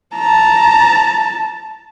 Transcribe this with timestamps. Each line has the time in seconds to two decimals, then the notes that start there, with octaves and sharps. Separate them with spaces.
0.16 A5 A#5